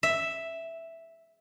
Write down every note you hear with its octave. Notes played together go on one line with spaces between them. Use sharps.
E5